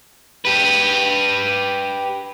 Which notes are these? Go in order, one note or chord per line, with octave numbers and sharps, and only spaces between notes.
G4 B4